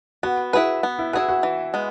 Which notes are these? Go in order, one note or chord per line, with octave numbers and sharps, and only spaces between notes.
B3 F#4
E4 F#4 G#4 B4
B3
E4
E4 F#4 G#4 B4
F#4
E3
G#3 B3